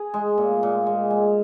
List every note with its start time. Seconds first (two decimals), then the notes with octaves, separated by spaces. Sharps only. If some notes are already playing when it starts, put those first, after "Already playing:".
Already playing: G#4
0.14 G#3
0.38 A#2
0.63 A#2
0.87 G#3
1.10 G#3